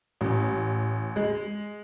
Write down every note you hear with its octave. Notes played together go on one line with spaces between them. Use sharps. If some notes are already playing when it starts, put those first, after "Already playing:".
A1
G#3